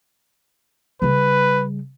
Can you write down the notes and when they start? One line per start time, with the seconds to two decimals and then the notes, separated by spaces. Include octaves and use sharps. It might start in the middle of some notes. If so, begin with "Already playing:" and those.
1.02 C#3 G3 B4